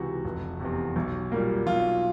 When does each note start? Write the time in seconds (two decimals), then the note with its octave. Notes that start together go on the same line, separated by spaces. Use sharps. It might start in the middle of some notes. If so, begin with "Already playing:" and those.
Already playing: C#2 C3 E3 F#4
0.25 F1
0.60 E2 C3
0.96 B1
1.32 A#2 G3 A#3
1.67 B1 F4